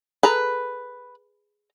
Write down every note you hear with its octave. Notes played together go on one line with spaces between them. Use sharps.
G#4 A4 B4 A#5